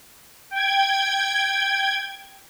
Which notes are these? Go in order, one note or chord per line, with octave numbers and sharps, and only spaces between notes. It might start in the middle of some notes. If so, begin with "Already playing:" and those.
G5 G#6